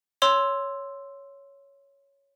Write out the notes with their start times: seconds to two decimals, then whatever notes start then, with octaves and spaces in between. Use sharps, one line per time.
0.22 C#5 C6 E6 F7